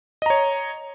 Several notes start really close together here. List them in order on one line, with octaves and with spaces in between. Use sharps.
D#5 A#5 C#5